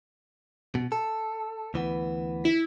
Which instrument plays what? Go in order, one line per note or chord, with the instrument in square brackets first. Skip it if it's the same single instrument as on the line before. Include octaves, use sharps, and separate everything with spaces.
[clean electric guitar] B2
A4
D2 E3 B3
[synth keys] E4 B6